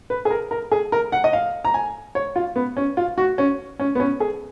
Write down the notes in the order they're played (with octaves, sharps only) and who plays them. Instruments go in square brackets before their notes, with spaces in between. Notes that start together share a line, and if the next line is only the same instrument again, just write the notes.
[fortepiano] B4
G#4
A#4
A#4
G#4
A#4
F#5
D#5
F5
A#5
G#5
C#5
F4
B3
C#4
F4
F#4
C#4
C#4
B3
C#4
G#4